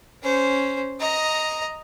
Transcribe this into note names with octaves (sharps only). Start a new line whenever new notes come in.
C#4 C5
D#5 A#5